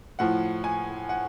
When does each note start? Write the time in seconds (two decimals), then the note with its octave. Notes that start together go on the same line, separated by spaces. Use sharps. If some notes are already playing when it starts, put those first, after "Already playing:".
0.19 A2 F3 F#5
0.64 G#5
1.09 F#5